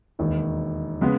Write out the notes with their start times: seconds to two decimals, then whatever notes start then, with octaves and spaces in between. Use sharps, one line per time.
0.19 E1 D#2 D#3
1.01 C#3 G#3 B3